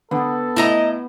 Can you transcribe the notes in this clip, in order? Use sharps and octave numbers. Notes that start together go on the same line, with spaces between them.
D3 B3 A4
A2 E4 D#5 A#5